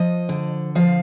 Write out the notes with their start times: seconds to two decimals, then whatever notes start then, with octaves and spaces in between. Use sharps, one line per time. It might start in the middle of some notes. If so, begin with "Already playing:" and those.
Already playing: F3 D#5
0.29 D3
0.75 F3 F5